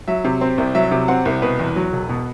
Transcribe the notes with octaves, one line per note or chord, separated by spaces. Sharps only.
F#3 E5
C3
C4
C2
F#3 E5
C3
C4 F#5
C2
B2 B4
E2
F#3
E1
B2